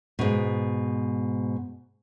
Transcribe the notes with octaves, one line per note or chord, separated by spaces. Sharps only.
G#2 B2